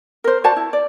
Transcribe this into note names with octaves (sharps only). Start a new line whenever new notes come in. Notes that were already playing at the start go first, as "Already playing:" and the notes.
A#4 C5
F#4 C5 D5 A5
E4
D5